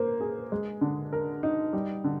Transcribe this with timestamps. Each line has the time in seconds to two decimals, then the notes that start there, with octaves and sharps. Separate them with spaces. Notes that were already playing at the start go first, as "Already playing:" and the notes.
Already playing: A#3 C5
0.21 G#4
0.52 G#3
0.81 D3
1.13 A#4
1.43 D#4
1.73 G3
2.04 D3